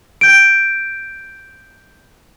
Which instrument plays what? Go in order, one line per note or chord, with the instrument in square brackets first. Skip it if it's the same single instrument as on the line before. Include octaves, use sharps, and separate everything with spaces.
[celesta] G6 D7